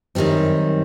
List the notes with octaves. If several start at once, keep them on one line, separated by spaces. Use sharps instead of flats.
F#2 D#3 G3 C4